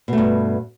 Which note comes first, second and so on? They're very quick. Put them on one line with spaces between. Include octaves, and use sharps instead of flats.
B2 A3 G2